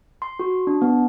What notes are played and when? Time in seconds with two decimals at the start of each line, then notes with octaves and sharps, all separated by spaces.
0.22 C6
0.39 F#4
0.67 D4
0.82 B3